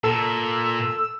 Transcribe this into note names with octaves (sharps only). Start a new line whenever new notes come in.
A#2 A4 E6